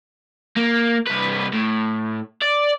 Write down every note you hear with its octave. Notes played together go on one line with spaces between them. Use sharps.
A#3
C2 B4
A2
D5